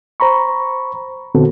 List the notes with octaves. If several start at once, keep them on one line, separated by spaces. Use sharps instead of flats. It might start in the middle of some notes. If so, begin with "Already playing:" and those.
C5 A#5 B5 C#6
A#2 D3 B3 C4 F#4 A4